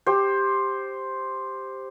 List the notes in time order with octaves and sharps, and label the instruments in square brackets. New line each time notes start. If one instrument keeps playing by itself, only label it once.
[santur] G4 C5